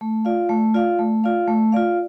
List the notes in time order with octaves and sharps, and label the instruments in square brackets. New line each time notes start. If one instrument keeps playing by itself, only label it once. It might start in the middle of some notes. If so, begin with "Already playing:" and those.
[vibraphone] A3
F4 D5 F5
A3
F4 D5 F5
A3
F4 D5 F5
A3
F4 D5 F5